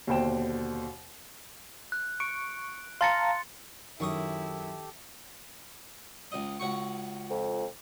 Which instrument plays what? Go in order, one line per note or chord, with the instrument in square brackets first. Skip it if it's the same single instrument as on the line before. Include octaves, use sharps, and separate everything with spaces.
[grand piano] D#2 B2 D3 C5 G5 E7
[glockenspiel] F#6
[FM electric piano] C#6 [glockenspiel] D7
[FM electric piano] F5 A5 A#5 [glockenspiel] C6 A6 C#7
[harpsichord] F#2 C#6 D#6 [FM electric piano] D#3 [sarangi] E4 [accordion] G4 A4
[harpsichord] C#2 D#5
C#2 F#4 C#6
[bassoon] F2